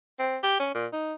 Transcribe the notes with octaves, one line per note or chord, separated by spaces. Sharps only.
C4
G4
C#4
A#2
D#4